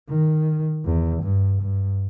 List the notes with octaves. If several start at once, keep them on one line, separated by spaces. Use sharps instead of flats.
D#3
E2
G2
G2